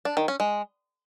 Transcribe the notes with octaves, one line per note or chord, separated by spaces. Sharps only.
D4
D#3
C#4
G#3